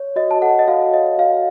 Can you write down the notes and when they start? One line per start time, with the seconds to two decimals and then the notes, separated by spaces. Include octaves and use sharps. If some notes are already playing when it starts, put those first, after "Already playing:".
Already playing: C#5
0.16 F#4 D#5
0.31 A5
0.41 A4 F#5
0.59 D#5
0.68 F#4 F5
0.92 C#5 D#5
1.18 F#4 F5